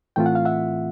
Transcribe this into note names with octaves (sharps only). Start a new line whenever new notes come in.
A2 E3 A3 C4 F4 G5
F#5
F5
E5 F#5